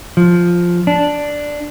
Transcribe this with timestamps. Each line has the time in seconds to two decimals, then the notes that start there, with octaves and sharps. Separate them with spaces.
0.17 F3
0.87 D4